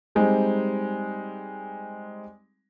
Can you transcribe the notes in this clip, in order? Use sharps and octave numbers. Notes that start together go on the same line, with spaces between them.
G3 G#3 C4 D#4